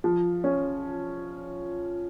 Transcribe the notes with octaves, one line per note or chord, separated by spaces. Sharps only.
F3
C#4